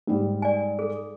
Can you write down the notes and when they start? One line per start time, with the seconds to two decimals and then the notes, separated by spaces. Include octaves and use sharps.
0.07 G#2 G3
0.42 D5 G#5
0.79 G#4 A4